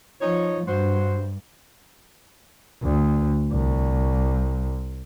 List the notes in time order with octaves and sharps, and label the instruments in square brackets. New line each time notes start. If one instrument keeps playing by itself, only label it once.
[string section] F3 [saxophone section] D#4 C#5
[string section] G2 [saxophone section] F#3 F#4 C5
[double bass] D2
C2